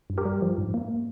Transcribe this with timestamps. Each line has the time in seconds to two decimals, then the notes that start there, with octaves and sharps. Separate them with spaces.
0.10 G2
0.18 G4 A#4
0.25 G3
0.42 F3
0.58 G#2
0.74 A#3